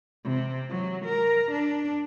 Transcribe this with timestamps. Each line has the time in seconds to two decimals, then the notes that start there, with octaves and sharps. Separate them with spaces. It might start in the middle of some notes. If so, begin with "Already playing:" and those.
0.25 C3
0.70 F#3
1.05 A#4
1.52 D4